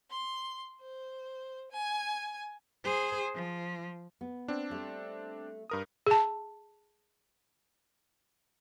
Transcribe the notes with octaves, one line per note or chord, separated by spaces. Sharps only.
C6
C5
G#5
G#4 C5
F3
B3
C4 D4
G3 A3
G2 A#4 D#6
G#4 A5